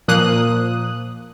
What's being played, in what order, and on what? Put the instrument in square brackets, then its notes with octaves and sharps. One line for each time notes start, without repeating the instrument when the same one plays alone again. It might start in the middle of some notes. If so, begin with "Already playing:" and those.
[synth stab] A#2 F3 A#3 D#6 F#6